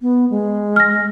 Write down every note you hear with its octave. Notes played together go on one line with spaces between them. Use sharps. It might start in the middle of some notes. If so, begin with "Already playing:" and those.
B3
G#3
F6 A#6